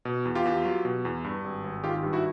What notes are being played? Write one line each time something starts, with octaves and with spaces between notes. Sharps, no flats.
B2
E2
F4 G4
E2
F#3
B2
E2
G2
G#1
G#1
D#3 F4 G4
G2
E4 F#4